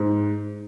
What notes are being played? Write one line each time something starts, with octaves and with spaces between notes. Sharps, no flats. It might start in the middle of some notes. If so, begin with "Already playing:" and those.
Already playing: G#2